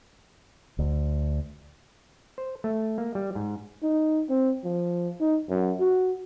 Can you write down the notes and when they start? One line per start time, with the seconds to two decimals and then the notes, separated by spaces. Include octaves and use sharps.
0.79 D2
2.38 C5
2.64 A3
2.98 A#3
3.15 G3
3.35 G#2
3.83 D#4
4.29 C4
4.64 F3
5.20 D#4
5.49 F#2
5.80 F#4